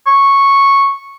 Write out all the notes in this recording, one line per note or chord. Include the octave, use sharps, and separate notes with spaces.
C#6